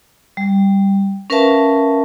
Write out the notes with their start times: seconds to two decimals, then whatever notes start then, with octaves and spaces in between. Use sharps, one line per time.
0.37 G3
1.30 C#4 A#4 B4 E5 F5 A5